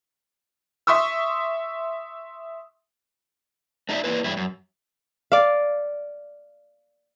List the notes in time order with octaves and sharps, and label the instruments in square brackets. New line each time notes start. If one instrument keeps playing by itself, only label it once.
[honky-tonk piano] E5 C6 C#6 D#6 E6
[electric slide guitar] A3 D#4 E4 A4 D5 E5
A#3 E4 B4
E2 G2 E4
F#2
[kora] D5 F5